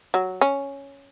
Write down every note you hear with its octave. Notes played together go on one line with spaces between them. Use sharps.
F#3
C#4